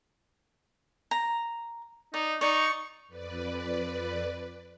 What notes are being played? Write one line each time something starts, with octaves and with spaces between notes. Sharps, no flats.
A#5
D#4 D5
D#4 D5 C#6
F2 B4 D5